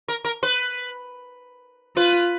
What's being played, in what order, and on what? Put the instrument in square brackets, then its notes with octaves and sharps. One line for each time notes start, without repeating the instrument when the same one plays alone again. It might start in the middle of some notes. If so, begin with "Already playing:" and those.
[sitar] A#4
A#4
B4
[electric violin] F4 [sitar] B4